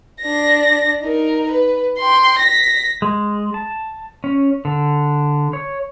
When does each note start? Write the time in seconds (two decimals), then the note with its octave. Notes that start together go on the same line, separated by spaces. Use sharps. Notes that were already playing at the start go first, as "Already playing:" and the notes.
0.21 D4 A#6
1.02 D#4 A#4
1.51 B4
1.98 G5 C6
2.39 A#6 B6
3.02 G#3
3.54 A5
4.24 C#4
4.65 D3
5.53 C#5